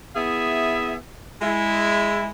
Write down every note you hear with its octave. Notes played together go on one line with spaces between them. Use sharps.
B3 E4 G#4 E5
G#3 E4